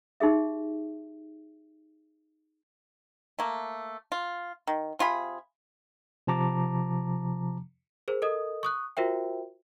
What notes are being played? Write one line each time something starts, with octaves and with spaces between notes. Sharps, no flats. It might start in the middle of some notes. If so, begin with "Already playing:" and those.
D#4 G4 G#4 E5
A3 A#3
F4
D#3
C3 F4 G#4 B5
C3 F3 A5 A#5 D6
G#4 A#4 C5
A4 A#4 D#5 D#6
C#6 D#6 F#6
F4 F#4 A#4 C5 E5 G5